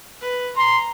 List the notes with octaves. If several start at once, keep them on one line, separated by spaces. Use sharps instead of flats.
B4
A#5 C6